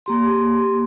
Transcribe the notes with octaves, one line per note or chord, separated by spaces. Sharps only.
A#3 G4 C6